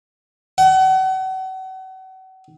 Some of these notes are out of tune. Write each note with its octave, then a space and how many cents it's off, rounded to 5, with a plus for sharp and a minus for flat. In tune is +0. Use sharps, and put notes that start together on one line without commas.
F#5 +35